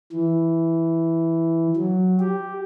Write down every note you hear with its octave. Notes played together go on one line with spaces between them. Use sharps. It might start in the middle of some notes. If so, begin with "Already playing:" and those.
E3
F#3
G4